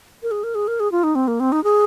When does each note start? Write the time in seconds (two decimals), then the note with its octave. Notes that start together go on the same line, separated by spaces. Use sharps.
0.23 A#4
0.31 G#4
0.44 A#4
0.55 G#4
0.68 A#4
0.80 G#4
0.92 F4
1.04 D#4
1.15 C4
1.28 A#3
1.40 C4
1.52 D#4
1.64 G#4